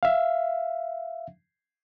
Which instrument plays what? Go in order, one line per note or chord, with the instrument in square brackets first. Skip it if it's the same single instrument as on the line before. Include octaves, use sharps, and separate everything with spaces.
[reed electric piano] E5 F5